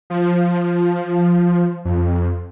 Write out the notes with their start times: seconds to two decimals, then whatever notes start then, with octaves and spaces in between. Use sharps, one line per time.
0.10 F3
1.85 F2